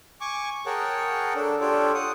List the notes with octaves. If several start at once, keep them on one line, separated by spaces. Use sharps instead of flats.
G#5 C#6 D6
G#4 A#4 C#5 F#5 G5 A5
D4 A4
D4 F4 G4 A4 C#5 D5
F#5 D#6